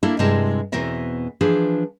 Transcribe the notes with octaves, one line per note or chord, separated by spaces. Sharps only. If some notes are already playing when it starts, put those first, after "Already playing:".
A#3 D4 E4 A4
G2 C3 G#3 E4 A#4 A5
E2 B2 E3 C4 A#4 E5
E3 F3 D4 G#4